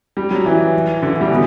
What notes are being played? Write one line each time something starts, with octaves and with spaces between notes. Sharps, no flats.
G3
F#3
E3
D3
E3
G3
B2